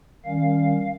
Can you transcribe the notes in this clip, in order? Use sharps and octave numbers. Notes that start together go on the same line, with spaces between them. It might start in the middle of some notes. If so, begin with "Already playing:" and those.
D#3 G3 C#4 F5